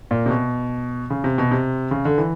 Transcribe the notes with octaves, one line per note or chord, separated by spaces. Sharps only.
A#2
C3
B2
C#3
C3
B2
C3
C#3
D3
E3